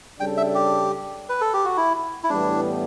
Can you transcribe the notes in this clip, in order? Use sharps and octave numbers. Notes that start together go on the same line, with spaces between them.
C#3 G3 D4 A4 G5
E5
G4
B4
A4
G4
F#4
E4
E4
A2 E3 G3 B3 D4